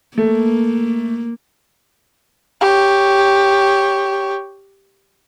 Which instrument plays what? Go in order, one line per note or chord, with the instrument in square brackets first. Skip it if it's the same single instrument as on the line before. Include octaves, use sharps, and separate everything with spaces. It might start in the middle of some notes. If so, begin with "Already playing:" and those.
[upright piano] A3 [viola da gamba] A#3
[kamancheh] G4 C#5